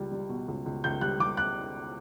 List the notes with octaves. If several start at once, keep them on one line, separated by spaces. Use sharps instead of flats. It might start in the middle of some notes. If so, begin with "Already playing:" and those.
Already playing: C#2 G3
G3
B2
C#2
C#2
C#2 G6
G3 F#6
G3 D6
F#6